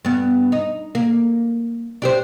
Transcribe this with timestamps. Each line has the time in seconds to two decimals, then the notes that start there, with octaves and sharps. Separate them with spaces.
0.05 G2 B3
0.52 D#4
0.95 A#3
2.02 D4 G4 C5